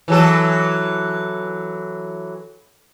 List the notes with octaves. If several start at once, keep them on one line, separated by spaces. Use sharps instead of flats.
E3 F#3 A4